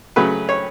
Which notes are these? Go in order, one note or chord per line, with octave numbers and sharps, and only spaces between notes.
C#3 F#3 A3 B4
C#5